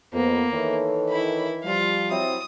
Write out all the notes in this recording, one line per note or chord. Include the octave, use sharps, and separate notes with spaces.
F2 A#3 B3
D#3 E3 A4 C#5
E4 B5
F3 G3 F4 F5
F#3 C4 E4 D#6